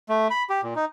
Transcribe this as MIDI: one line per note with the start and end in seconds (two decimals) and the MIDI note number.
0.09 0.28 57
0.30 0.43 83
0.50 0.61 67
0.64 0.74 46
0.76 0.85 63